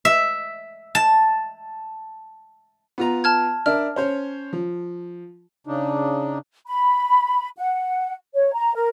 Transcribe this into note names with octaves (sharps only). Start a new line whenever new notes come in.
E5
A5
B3 F4 A#5
A5 F6 G#6
D4 A#4 E5 F6
C#4 C5 C#5
F3
C#3 D4 D#4
B5
F#5
C#5
A#5
A#4